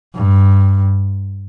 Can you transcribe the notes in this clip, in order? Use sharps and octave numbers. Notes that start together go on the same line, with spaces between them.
G2